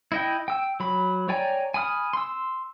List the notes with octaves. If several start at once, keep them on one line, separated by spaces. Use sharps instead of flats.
E4 D#5 G5
G5 E6
F#3 B5
C#5 D5 G5 G#5 A#5
G#5 B5 D#6 F6
C6 E6